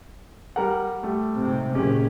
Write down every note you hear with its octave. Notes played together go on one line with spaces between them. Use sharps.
G3 A#4 F#5
G3 A3
G#2 C3
F#1 A#2 G#3 C#4 G4